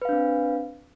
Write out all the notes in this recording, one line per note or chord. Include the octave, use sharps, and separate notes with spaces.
C4 D4 B4 F5